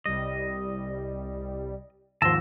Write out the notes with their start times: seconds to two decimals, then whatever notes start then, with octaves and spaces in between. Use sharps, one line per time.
0.06 C2 G3 D#5
2.22 D#2 G#2 F3 A5 C6 E6 A#6 E7